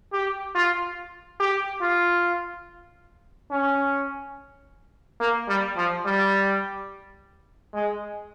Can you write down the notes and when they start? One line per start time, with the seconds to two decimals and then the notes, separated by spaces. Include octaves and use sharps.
0.13 G4
0.55 F4
1.40 G4
1.81 F4
3.51 C#4
5.20 A#3
5.49 G3
5.77 F3
6.05 G3
7.74 G#3